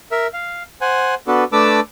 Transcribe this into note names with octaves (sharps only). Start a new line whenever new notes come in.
A#4 E5
F5
C5 F#5 G#5
B3 D4 F#4 A4 B4
A3 D4 B4 A5 D6 E6